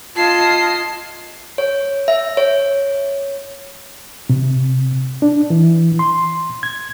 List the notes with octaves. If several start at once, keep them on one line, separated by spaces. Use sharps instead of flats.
F4 D#5 A5 G#6 C7
C#5
E5
C#5
C3
D4
E3
C6
G#6